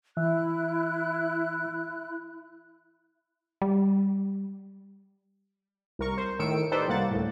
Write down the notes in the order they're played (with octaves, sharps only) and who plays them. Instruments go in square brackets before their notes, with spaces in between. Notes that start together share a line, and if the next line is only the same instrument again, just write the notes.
[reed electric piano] E3 E5 [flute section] E4 F#6
[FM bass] G3
[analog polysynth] C2 A#4 C#6
C5
A2 D#3 E6 C#7 D7
D#4 G4 A4 B4 C5 D5
C2 A#3 F#5 A6
D2 A2